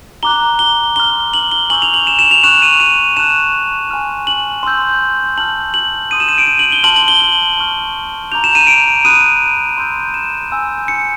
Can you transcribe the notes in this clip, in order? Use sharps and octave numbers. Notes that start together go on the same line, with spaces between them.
A#5 D6 F#6 G7
G7
C6 F6 G7
F#7
G7
G#5 C#6 E6 G6 F#7
F7
F#7
E7
E7
F7
C#6 F#6 E7
D#7
D#7
A5 C#6 F#6 E7
G#5 C6 F6
F#7
C6 E6 G6
A5 C6 F6 F#7
F#7
C6 D#6 G6 D#7
E7
D#7
D7
D#7
F#7
G7
A5 C6 F6 F#7
F#7
G7
F#7
A5 C#6 F6
A#5 D6 G6 F7
E7
D#7
D7
B5 D#6 F#6 D#7
C6 E6 G6
E7
G#5 C6 E6 G6
C#7